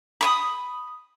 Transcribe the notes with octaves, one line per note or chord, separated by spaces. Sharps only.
B5 C#6 D#6